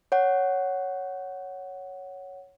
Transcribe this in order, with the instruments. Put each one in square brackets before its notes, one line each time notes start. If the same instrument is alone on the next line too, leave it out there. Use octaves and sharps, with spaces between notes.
[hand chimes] C#5 F#5